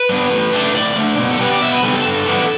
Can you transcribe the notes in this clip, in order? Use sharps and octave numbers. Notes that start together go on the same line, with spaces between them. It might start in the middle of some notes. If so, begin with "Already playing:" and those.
Already playing: B4
G3 B3 D4
A2
A3 D4
A2 D5
A3 D4
B2
A4
G3 B3 B4
D5
B2 E5
B4
G3 B3 A4
A4
G2
E3 B3 D4